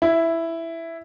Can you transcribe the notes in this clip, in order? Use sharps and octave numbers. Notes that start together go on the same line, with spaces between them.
E4